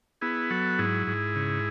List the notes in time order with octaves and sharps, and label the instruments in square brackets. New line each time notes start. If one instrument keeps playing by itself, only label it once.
[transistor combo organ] B3 E4 G#4
F#3 F#4 A4
G#2 E4 G#4
G#2
C#3